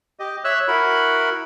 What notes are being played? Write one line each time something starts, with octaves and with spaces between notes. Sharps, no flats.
G4 D#5
C#5 E5 E6 F#6
E4 F#4 A#4 B5